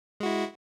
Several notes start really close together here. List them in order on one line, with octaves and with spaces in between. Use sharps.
G#3 F#4 E4